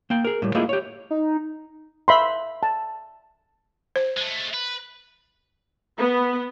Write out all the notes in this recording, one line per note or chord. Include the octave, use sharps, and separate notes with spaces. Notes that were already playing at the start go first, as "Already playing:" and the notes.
A#3 G5
G#4 A#4
A2 G3
A3 A#3 E4 F4 G#4 D#5
G4 C#5
D#4
E5 B5 C6
A5
C5
G#3 A3
B4
B3